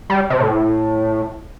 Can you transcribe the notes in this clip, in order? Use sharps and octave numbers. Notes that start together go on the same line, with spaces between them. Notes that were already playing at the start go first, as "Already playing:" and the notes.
G3
C3
A2